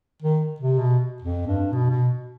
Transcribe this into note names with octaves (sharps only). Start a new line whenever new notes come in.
D#3
C3
B2
F2
G2
B2
B2